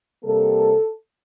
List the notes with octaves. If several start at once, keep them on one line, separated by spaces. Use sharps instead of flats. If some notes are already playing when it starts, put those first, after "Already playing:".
C3 G3 A#3 A4